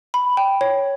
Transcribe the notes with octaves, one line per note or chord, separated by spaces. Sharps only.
B5
G5
C#5